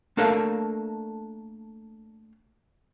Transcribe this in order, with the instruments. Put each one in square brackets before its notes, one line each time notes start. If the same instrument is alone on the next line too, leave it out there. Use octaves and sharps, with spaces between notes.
[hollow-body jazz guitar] A3 A#3 D4 A4 A#4 F5